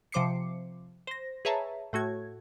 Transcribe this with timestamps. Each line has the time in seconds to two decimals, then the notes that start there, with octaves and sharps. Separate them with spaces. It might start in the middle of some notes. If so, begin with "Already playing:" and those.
0.12 C3 F3 C5 D6 C7 C#7
1.07 C5 A#6
1.45 G#4 B4 C#5 E5 A5 A#5
1.93 A2 A3 F#4 G#6